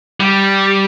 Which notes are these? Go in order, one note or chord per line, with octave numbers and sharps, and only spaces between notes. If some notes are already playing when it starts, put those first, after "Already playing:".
G3